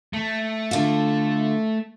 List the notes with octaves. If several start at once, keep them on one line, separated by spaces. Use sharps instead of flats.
A3
D3 F4